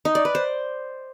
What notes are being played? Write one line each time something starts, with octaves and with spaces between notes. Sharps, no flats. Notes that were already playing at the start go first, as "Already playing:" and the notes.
D#4
D5
B4
C5